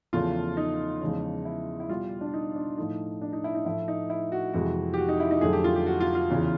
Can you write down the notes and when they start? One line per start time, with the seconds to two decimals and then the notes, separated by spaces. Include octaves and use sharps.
0.13 E2 C#3 F3 A3 F4
0.57 D#4
1.01 E2 C#3 F3 G#3
1.45 E4
1.80 E4
1.89 B2 G3 F4
2.21 D4
2.34 D#4
2.56 D4
2.78 A2 F3 A3 D#4
3.22 D4
3.33 D#4
3.44 E4
3.55 D#4
3.65 A2 F3 A3 E4
3.88 D#4
4.10 E4
4.32 F#4
4.53 F2 C3 E3 G#3 F#4
4.94 G4
4.98 F#4
5.08 D#4
5.20 E4
5.31 D#4
5.41 F2 D3 F#3 A3 G#4
5.53 G4
5.64 F4
5.76 G4
5.87 F#4
6.00 F4
6.15 F4
6.30 E2 C#3 E3